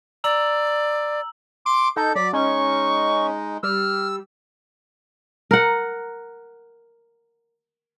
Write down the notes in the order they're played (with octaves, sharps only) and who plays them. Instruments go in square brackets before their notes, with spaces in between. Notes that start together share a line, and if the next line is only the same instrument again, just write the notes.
[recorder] D5 [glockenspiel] A#5 E6 F#7
[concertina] C6 D6 [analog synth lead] D7
[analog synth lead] D#4 [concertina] A4 [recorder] G6
[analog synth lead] F#3 [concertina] D5 [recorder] B6
[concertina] G#3 D#4 [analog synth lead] C#4 [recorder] C#6
[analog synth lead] G3 [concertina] E6 [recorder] F6
[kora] A#4 F#5